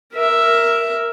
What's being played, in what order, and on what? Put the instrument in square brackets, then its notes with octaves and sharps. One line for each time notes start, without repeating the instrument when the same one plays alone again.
[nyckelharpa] A#4 E5